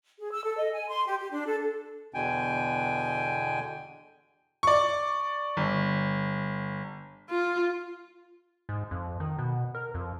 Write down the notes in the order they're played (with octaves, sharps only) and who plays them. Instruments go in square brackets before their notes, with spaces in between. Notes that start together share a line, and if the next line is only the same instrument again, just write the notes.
[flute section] G#4
E6
A4
D#5
G#5
C6
G4
G4
D4
A4
[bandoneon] E2 B2 D3 G5 G#5
[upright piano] D5 C#6
G1
[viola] F4
[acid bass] G#2
F2
D#3
B2
A#4
F2